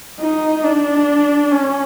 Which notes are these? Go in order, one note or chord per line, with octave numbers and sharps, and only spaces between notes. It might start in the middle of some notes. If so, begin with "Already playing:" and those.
D#4
D4
C#4